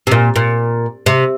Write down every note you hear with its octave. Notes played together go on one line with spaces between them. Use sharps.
C3
A#2
A#2
C3